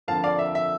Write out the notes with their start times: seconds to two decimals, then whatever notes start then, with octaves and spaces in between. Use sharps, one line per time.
0.08 F2 D3 F3 A#3 F5 A5
0.24 D5 F5
0.39 E5
0.55 E5